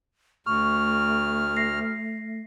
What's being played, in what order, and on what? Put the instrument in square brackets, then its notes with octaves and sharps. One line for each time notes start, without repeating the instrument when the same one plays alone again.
[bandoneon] D2 F6 [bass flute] A3 [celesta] C#6
[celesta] A#6 C7